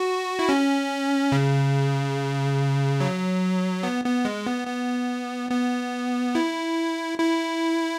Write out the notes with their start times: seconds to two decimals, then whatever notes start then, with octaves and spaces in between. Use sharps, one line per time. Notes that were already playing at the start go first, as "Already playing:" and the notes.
Already playing: F#4
0.39 E4
0.49 C#4
1.32 C#3
3.00 F#3
3.83 B3
4.04 B3
4.25 G#3
4.46 B3
4.67 B3
5.51 B3
6.35 E4
7.18 E4